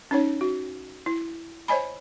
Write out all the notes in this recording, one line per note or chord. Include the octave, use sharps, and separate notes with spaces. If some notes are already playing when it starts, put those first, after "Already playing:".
C#4 D#4 C#5
F#4
E4
C5 C#5 D#5 G#5 B5